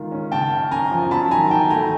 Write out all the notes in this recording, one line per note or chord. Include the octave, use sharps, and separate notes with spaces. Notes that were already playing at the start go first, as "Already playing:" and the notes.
Already playing: D#3 G#3 F4
C#4
C#3 G5 A5
F#2
F#2 G#5 A#5
F3
F#3 A5 B5
D#3 G#5 A#5
D#3 G5 A5
A3 G#5 A#5